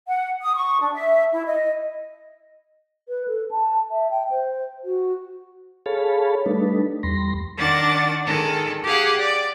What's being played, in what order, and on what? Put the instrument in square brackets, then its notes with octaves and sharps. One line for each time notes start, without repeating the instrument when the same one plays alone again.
[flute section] F#5
D#6
C#6
D4
E5
E4
D#5
[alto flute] B4
A4
A5
E5
G5
C5
F#4
[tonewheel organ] G#4 A4 C#5 F5 A5 B5
G3 A3 D4 D#4 A4 B4
E2 G3 B5 C6 A#6
[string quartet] D#3 D4 D5 F#5 A6
D#3 G#3 A4
G4 G#4 F5 F#5
D5